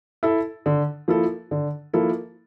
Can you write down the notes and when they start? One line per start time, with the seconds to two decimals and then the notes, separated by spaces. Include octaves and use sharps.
0.23 E4 A4 E5
0.66 D3
1.08 F3 A#3 E4 A4
1.51 D3
1.93 F3 A#3 E4 A4